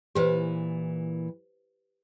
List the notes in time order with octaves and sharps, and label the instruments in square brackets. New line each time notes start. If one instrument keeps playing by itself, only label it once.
[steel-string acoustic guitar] A#2 E3 [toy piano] G4 B4 C5